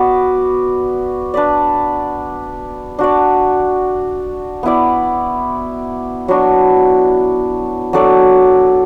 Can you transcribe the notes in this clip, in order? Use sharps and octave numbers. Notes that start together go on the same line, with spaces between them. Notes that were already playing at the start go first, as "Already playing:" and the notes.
Already playing: B3 F#4 B4 D5
D4 B4 D5
D4 F#4 D5
B3 E4 D5
F#3 B3 D4 F#4
F#3 D4 A4 D5